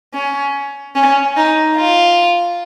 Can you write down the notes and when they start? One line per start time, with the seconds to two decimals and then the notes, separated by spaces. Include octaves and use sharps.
0.14 C#4
0.96 C#4
1.37 D#4
1.77 F4